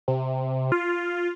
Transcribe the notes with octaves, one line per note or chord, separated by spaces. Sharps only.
C3
F4